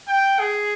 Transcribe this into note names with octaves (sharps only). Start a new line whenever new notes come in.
G5
G#4